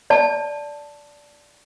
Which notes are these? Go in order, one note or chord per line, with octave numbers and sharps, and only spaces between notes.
D5 A5